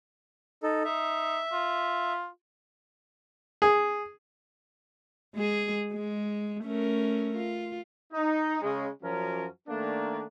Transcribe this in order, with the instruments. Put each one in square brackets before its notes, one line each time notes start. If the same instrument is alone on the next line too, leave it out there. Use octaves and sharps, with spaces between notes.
[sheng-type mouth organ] D#4 A4
[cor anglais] D#4 [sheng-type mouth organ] E5
[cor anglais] F4
[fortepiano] G#4
[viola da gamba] G#3 G#4
G#3
A3 C#4 A#4
F4
[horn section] D#4
C#3 G#3
F#2 F3 F#3 C#4 A#4
D#3 A3 A#3 D4